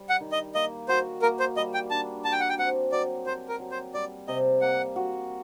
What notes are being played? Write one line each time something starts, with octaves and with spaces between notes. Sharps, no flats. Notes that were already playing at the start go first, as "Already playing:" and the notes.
Already playing: G3
F#5
D#3
D#5
A#3 D#5
F#4 C5
A#3 A#4
C5
G3 D#5
G5
D4 A5
F#4 A5
G5
F#5
G5
C4 F#5
F#3 D5
G4 C5
A#4
F#3
C5
G3 D5
C3 D#5
A#3 F#5
F#4